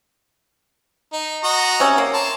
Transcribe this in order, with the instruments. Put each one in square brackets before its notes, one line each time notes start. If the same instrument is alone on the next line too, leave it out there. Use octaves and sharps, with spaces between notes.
[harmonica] D#4
F#4 D#5 A#5
[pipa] C3 C#4
A#3
[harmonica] A5 A#5 C6